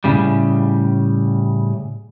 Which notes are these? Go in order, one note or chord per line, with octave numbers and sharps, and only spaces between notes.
A2 C#3 G3